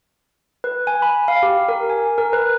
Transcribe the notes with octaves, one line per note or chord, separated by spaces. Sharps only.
B4
G#5
B5
F5
G4
A#4
G#5
A#4
B4